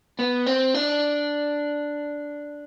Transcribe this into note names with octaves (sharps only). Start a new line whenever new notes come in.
B3
C4
D4